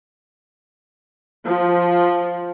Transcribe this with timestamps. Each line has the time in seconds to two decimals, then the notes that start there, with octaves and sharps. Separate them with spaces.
1.45 F3